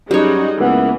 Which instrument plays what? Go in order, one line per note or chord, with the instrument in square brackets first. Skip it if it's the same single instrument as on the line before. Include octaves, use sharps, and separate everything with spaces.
[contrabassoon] F#2 [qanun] G3 C#5 [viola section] G#3 D#4 F#4
[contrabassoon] C#2 [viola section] E3 A#3 [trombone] B3